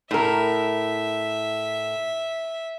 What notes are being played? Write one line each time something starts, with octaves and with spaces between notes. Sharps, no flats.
A2 A#4 E5